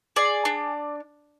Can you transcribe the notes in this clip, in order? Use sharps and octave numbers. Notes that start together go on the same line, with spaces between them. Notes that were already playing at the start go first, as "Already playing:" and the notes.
G#4 D5
D4